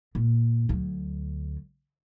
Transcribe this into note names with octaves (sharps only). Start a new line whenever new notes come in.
A#2
D2 F#3